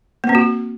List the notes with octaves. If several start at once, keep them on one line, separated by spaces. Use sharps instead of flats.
A#3
C4
F#4